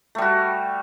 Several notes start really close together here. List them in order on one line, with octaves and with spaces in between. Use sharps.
A3 G3 F#4